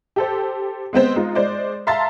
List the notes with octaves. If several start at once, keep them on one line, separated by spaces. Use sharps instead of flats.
G4 A4 C5
G#3 B3 C4 C5
G#3 D#4 F4
G#3 C5 D5
E5 F5 A5 A#5 C6 A6